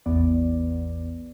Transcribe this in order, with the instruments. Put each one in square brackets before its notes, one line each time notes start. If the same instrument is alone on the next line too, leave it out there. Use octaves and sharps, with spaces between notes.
[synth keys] A1 E2 B3 D5